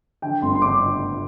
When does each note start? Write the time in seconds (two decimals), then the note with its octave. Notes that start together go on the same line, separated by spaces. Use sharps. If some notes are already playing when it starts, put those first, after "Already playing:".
0.22 D3 G5
0.42 G1 C6
0.55 C6
0.62 D3 D6